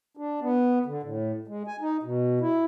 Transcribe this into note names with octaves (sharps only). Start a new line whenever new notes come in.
D4
B3
D3
A2
G#3
G#5
D#4
B2
E4